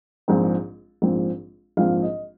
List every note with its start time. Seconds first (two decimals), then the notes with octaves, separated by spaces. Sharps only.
0.28 A#1 G#2 F3 C4
1.02 A#1 G#2 F3 C4
1.77 A#1 G#2 F3 C4 F5
2.02 D#5